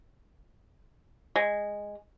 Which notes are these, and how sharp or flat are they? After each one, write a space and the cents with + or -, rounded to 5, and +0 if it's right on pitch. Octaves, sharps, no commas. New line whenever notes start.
G#3 -10